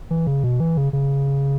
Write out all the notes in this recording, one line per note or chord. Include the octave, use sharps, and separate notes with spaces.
E3
C#3
B2
E3
C#3
C#3